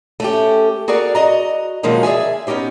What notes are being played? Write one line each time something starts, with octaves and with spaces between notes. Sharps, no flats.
A3 C#4 G4
F#4 G#4 A#4 D5 F#5
F#4 D#5 A#5
B2 D#3 F3 F#3 G#3 A#3
G#4 D5 E5 G#5
B3 C#4 D#4 G4 C5